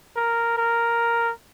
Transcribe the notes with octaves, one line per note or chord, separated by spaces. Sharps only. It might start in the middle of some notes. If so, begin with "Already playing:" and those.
A#4
A#4